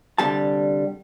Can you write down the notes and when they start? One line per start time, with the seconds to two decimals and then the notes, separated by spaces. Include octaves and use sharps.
0.18 C2 D3 G3 A5